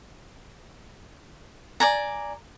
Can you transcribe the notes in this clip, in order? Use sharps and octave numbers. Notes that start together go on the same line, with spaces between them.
D5 G#5 A#5